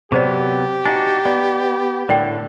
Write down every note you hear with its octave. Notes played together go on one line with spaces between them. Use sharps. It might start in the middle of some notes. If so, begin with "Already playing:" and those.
C3 F#3 B3 G4 G#4 C5 D5
D4 D#4 F#4 G#5
B3 D5
A2 D3 A#4 D5 G5